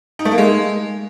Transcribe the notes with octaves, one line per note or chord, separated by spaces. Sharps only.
D#4
A3
A#3
G#3